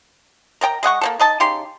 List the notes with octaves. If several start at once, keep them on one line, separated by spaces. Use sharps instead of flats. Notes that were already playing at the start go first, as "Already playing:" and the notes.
A#4 D#5 G5 A#5
G#3 D#5 F#5 C#6
A#3 C4 A4
D#4 D#5 A5
C#3 D#4 G4 C6